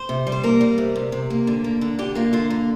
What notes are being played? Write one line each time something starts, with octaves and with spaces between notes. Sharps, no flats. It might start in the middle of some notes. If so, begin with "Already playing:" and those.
Already playing: C5
C3
G3
C5
A#3 A#4
G3
C3
C3
C3
A#3
D3
A#3
D3
D3 G4
A#3 F4
D3 F4
A#3